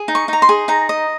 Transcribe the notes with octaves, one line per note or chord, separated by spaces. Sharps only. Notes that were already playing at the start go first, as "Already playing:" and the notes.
Already playing: G#4
D#4
C#6
D#4 A#5
C6
G#4
D#4 A#5
D#5